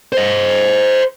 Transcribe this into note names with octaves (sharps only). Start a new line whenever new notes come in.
C5 D#5